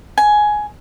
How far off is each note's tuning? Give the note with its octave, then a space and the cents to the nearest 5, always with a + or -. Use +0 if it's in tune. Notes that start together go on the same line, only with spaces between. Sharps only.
G#5 +10